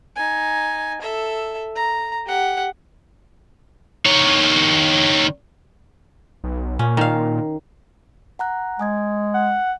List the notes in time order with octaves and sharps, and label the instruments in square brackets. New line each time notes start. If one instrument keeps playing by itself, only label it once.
[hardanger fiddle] D#4 G#5
A4 E5
A#5
G4 F#5
[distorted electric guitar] D#3 C#5
[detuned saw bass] B1
[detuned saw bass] A#2 [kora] C#4
[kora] D#3 F5
[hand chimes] F#5 A#5 F#6
[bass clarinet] G#3 [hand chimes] G#5 D#6 G#6
[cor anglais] F#5